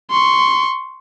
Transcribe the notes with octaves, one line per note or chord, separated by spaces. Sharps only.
C6 C#6